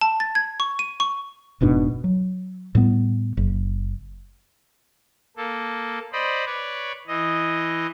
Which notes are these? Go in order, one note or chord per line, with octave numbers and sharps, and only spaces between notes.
A5
A6
G#6
C#6
D#7
C#6
F1 G#2 B2 D4
F#3
A2 G3 B3
F#1
A#3 A4
C5 D5 D#5 B5
B4 C#5 D5
E3 D#5